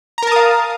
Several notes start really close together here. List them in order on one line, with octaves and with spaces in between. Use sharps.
A#5 A#4 A5 D#6 F5